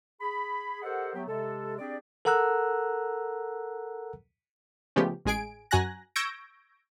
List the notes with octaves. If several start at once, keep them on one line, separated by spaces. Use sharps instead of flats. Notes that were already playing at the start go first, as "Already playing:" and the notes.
G#4 B5
G4 A4 A#4 C5 D#5 F#5
F#3 A3 B3 G4
C3 G#3 A4
C4 D4 G4 G#4 D5
A4 A#4 F#5 A#5 E6 F#6
C#3 F3 G#3 A3 B3 G4
A1 G#3 G#4 G#5 D7
F#2 F#4 G#5 A#5 F#6 A#6
C#6 E6 G6 G#6 A#6 D7